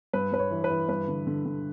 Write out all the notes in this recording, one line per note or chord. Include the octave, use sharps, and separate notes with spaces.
G2 B4
G2 B4
C#5
E3
B4
E3
G2 B4
D3
D3
D3